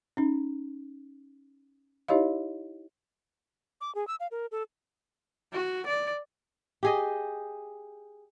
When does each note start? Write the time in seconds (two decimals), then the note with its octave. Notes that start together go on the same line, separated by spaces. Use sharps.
0.17 C#4 D#4
2.08 D#4 E4 G4 C#5 D#5 F5
3.81 D6
3.95 G#4
4.07 E6
4.20 F5
4.31 A#4
4.52 A4
5.53 F#4
5.86 D5
6.83 G4 G#4 D#5